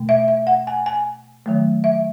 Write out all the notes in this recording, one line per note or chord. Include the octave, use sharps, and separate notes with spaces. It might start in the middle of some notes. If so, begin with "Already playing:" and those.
Already playing: B2 A3
E5
E5
F#5
G#5
G#5
D#3 F#3 A3
E5